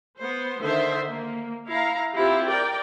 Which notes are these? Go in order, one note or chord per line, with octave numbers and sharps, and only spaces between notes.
B3 C5
D3 D#3 C5 E5
A#3
E4 F5 A#5
C4 E4 F4 G4
A#4 D5 G5